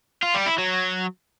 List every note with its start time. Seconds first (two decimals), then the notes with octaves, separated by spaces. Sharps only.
0.23 F4
0.35 G3
0.47 E4
0.58 F#3